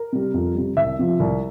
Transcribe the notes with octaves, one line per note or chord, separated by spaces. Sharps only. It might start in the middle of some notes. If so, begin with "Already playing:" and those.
Already playing: A#4
C3 G3
F2
C3 G3
C2 E5
C3 F3
C2